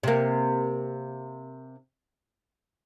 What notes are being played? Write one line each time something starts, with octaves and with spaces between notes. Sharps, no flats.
C3 A#3